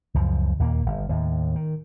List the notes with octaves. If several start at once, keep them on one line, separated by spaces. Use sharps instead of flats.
C#2 F#2 F3
D#2 A#2 A3 A#3
G1
D#2 A2
D#3